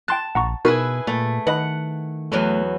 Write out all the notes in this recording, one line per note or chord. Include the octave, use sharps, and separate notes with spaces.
G5 A5 C6 F#6
A#1 F#5 A#5 C#6
B2 D#4 E4 F#4 G#4 A#4 B4
A#2 A3
D#3 B4 D#5 F#5 B5
E2 F#3 A3 B3